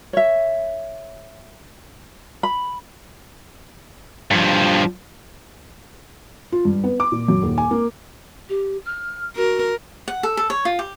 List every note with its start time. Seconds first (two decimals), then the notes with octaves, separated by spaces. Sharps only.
0.13 C#5 E5
2.43 B5
4.31 G2 F3
6.52 F4
6.65 G2
6.84 B3
7.00 D6
7.12 A#2
7.28 F#2
7.43 D#1
7.58 G#5
7.71 A#3
8.49 G4
8.85 F6
9.36 F#4 A#4
10.08 F#5
10.23 A4
10.37 A4
10.50 C#5
10.65 F4
10.79 G4